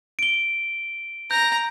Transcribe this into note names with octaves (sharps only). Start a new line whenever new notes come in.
D7 G7
A#5 G6